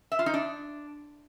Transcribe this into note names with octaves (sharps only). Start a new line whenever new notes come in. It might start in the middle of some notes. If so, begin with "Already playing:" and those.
E5
F4
D#4
D4